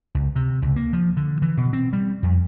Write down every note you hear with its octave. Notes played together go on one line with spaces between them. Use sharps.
C#2
C3
C#2
A#3
F3
D3
E3
B2
C4
G3
F2